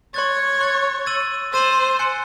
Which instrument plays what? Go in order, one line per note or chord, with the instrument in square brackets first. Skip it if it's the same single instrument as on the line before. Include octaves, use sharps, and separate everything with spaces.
[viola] C#5 [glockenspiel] C6 F#6 A6
[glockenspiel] C6 F#6 A6
E6 A6 D#7 F#7
[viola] C5 [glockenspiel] E6 A6 D#7 F#7
[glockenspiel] G#5 C6 F#6 C#7